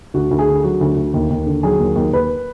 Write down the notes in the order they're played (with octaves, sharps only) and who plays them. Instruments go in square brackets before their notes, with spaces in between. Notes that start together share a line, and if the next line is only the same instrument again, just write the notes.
[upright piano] D2 F#4
D2
G#4
D3
F#3 F#4
D2
D2
D#2
D#2
D3
F#3 G#4
D#2
D#2
D#2 B4